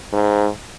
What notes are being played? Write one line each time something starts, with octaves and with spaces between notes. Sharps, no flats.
G#2